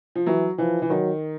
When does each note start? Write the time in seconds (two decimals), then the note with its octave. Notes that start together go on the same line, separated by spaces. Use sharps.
0.15 F3
0.26 E3 F#3
0.58 E3 F3
0.82 E3
0.90 D#3 F#3